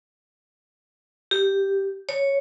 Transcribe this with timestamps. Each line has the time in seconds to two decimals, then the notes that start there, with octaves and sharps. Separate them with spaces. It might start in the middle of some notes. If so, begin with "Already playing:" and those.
1.31 G4
2.09 C#5